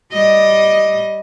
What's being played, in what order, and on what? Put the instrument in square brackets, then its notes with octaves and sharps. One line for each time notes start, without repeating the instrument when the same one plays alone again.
[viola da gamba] G3 D#5